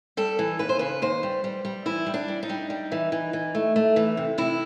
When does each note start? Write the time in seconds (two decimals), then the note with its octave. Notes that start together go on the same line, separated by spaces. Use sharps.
0.17 G3 A4
0.39 E3
0.59 D#2 B4
0.69 C5
0.79 C#3 B4
1.02 D#2 C5
1.23 G3
1.44 G3
1.65 G3
1.86 E3 E4
2.06 G3
2.14 D4
2.28 G3
2.43 D#4
2.49 G3
2.70 G3
2.92 E3
3.12 E3
3.33 E3
3.55 A3
3.76 A3
3.96 E3
4.17 C3
4.38 C3 E4